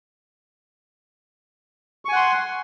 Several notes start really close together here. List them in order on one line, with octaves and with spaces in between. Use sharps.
C#6 G#5 F#5 C6